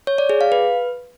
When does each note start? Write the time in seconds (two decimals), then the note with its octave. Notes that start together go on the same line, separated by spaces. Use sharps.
0.07 C#5
0.18 D5
0.29 G#4
0.41 F5
0.52 B4